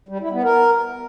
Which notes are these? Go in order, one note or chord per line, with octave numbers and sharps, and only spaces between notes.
G3
E4
B3
A#4